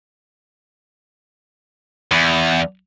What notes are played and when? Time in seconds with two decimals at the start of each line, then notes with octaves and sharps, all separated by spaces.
2.12 E2